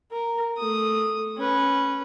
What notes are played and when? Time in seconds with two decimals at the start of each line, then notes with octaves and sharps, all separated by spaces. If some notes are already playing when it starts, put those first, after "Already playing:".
0.12 A#4
0.57 A3 D#6
1.37 C#4 B4